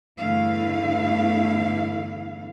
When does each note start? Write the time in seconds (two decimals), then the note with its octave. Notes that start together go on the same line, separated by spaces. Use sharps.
0.18 E2 G2 D3 A3 E4 F5